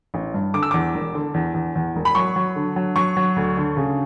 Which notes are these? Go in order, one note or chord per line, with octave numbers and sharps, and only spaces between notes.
A1
G2
D3 D6
E6
E2 D6
E1
D3
E2
E2
E2
E1
B5
F#3 C#6
F#3
D3
F#3
F#3 C#6
F#3
D2
D3
C#3